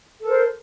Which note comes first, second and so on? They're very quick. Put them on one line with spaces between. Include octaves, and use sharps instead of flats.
A4 A#4 C5